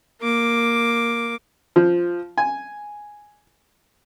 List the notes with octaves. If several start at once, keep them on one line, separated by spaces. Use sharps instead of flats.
A#3 D6
F3
G#5